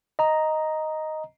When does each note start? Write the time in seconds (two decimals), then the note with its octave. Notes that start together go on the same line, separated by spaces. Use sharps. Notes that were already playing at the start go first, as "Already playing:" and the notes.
0.19 D#5 A#5